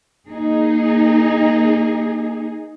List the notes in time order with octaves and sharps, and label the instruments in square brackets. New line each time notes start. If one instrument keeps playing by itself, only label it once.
[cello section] A#3 D#4 G#4